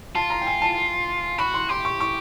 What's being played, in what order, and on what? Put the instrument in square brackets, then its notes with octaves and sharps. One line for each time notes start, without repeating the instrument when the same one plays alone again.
[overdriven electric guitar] F4 [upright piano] A5
[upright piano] A#5
G5
G#5
A5
[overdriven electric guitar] F#4 [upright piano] B5
[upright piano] C6
[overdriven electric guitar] G4 [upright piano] C6
[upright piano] C#6
C#6